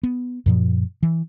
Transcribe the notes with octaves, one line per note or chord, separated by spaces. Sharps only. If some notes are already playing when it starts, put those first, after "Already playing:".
B3
F#2 A#2 F3
E3